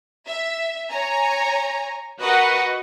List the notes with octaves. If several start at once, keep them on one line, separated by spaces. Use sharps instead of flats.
E5
C#5 G#5 A#5
F#4 A#4 B4 D#5 F#5